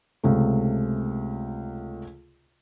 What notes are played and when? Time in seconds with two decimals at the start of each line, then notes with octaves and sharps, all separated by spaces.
0.24 C#2 C3 A3